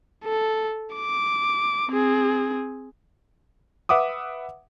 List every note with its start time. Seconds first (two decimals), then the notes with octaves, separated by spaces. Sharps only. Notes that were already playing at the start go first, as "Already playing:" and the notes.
0.25 A4
0.95 D6
1.89 C4 G#4
3.89 B4 E5 F#5 D6 D#6